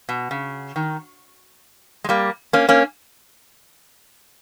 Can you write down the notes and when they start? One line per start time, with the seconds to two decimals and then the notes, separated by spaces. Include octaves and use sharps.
0.09 B2
0.31 C#3
0.76 D#3
2.04 G#3
2.09 G3 A#3
2.53 A#3 C#4
2.69 A#3 C#4